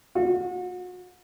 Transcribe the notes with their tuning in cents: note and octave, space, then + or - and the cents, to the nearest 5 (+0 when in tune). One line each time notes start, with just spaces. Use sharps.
F#4 -40